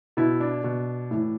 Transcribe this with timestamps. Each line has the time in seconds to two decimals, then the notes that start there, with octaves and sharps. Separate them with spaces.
0.17 B2 E4
0.40 D4
0.64 B2
1.11 A2 E3